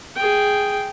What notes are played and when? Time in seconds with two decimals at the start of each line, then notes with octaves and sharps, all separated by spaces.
0.16 G#4 G5